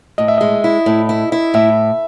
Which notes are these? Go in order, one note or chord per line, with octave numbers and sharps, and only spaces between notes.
A2 D#5
E5
G#3 D#5
E4
A2
E4
E4
A2 E5